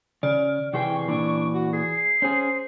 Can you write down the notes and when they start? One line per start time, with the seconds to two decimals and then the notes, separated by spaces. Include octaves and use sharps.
0.23 C#3 D5 F6
0.73 C3 E3 G#4 G5 C#6
1.08 A#2 E3 D4
1.54 F#4
1.73 G#4 C7
2.22 C#4 G#4 C5